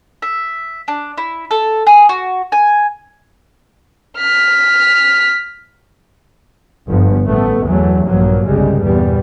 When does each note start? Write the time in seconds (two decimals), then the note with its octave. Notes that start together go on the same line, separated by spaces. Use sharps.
0.22 E5
0.88 D4
1.18 E4
1.51 A4
1.87 G#4
2.09 F#4
2.52 G#5
4.18 F6 B6
6.89 G1 G2 F3 B3
7.25 A1 A3 B3
7.64 E2 E3 F#3 A3
8.07 A#1 G2 F3 F#3 A#3
8.45 G1 C2 C#3 G3 G#3
8.80 E2 A#2 G3 B3